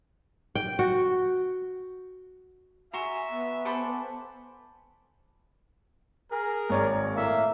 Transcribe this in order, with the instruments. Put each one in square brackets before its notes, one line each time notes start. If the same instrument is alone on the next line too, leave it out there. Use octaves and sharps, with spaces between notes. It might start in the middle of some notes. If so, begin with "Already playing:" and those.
[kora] G5
F#4
[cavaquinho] F#4 C6 [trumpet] E5 [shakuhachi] G#5 [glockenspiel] A#5 C#6 E7
[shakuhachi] B3
[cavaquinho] A4 C5 B5 [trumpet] D5 [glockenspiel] G#5 A5 C6
[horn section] G#4 A#4
[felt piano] G#1 C#5 D5
[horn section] A2 A#3 E5